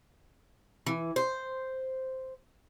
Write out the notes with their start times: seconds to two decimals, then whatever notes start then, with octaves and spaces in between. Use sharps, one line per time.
0.86 E3
1.16 C5